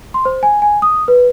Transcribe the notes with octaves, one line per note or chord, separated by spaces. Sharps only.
C6
C5
G#5
G#5
D#6
B4